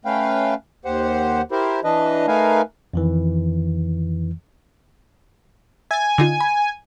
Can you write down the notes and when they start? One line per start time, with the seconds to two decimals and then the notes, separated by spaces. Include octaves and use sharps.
0.05 A3 C#4 B4 F5 G5
0.85 D#2 G4 C5 F#5
1.52 E4 G4 A#4 C5
1.84 E3 D4 B4 D#5
2.28 A3 D#4 A#4 B4 F5 G#5
2.94 F2 D#3 E3
5.91 E5 G#5 A6
6.18 D3 D#4 F4
6.41 B5